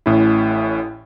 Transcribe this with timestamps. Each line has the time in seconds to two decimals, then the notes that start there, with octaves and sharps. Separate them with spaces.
0.06 A1 A2 C#4 E4